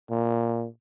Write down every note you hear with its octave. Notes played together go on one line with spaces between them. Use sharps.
A#2